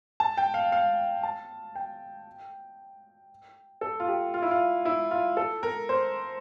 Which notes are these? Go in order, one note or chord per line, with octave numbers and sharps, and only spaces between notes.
A5
G5
F5
F5
A5
G5
A4
F4
G4
F4
E4
F4
E4
F4
A4
A#4
C5